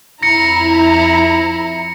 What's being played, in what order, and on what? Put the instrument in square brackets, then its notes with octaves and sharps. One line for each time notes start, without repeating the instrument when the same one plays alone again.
[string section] F2 E4 A#5 [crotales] A#6 C#7